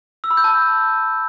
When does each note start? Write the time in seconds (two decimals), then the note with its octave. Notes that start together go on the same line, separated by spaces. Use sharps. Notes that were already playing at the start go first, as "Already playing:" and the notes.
0.24 E6
0.31 B5
0.37 G6
0.44 A5